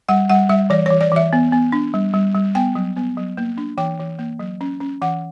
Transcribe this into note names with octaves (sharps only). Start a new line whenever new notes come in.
G3 F#5
G3 F#5
G3 E5
E3 D5
E3 C#5
D5
E3 E5
B3
B3
D4
G3
G3
G3
B3 G5
F#3
B3
F#3
A#3
D4
E3 G5
E3
A#3
F#3
C#4
C#4
E3 F#5